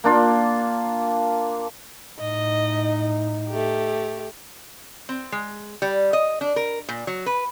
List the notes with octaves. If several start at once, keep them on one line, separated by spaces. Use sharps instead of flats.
A#3 D4 F4
A2 D#4 D#5
A3 G4
C4
G#3
G3
D#5
D4
A#4
A#2
F#3
B4